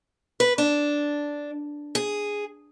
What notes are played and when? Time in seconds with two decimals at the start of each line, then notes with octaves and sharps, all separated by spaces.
0.40 B4
0.58 D4
1.95 G#4